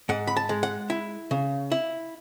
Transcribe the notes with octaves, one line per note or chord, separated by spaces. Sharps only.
G#2 F#5
B5
A5
G#3
F#5
E4
C#3
E4